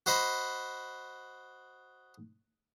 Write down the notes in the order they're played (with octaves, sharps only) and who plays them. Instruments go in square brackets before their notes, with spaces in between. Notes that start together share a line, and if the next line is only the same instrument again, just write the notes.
[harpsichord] F#4 C5 D#5 B5